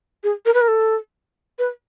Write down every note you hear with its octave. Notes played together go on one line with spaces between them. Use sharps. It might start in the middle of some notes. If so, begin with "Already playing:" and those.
G#4
A#4
B4
A#4
A4
B4